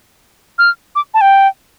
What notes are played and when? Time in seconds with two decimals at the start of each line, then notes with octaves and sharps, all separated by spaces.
0.58 F6
0.95 D6
1.14 A5
1.21 G5